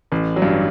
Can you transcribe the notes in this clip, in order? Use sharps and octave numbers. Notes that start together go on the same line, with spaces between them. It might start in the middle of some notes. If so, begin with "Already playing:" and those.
A1
F#3
G2